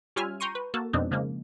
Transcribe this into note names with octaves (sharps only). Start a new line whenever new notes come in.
G3 C#4 F4 E5 G#5 F6
G5 A#5 C6 C#6 D#7
B4
A#3 F#4 A4 A5
F2 B2 G#3 C4 D4 D#4
C#3 F3 G#3 A#3